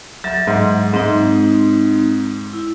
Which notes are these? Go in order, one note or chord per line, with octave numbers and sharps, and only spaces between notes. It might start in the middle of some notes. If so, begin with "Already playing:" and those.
F#3 E5 A6
G#2
G#2 C4 D#4
E4